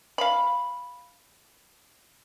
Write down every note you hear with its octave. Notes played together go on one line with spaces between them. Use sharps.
F5 B5